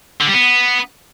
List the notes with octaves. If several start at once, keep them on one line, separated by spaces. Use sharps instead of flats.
D3
G3
B3